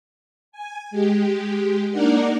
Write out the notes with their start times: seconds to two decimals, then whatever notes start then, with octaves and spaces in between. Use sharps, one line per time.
0.52 G#5
0.91 G#3 G4
1.90 A#3 D4 D#4 A#4 D5 F#5